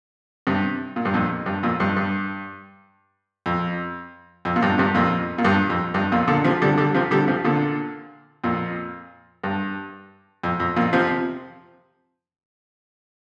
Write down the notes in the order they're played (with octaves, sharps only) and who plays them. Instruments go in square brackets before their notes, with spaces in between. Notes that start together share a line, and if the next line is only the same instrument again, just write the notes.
[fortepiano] G2 C3
A#2
G2
F2 A#2
G2
F2 A#2
G2
G2
F2
F2
A#2
G2
G2 C3
F2 A#2
A#2
G2
F2
G2
F2 A#2
A#2 D3
C3 F3
D3 G3
D3 G3
C3 F3
D3 G3
C3 F3
A#2 D3
F2 A#2
G2
F2
F2
F2 A#2
C3 F3